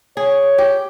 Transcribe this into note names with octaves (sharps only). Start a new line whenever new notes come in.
G#4 C#5
G4